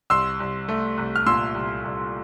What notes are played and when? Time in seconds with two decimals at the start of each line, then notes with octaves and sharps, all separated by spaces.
0.10 C2 C6 E6
0.40 C2
0.68 A3
0.98 C2
1.16 F6
1.26 A#2 C6 E6
1.54 C2
1.84 C2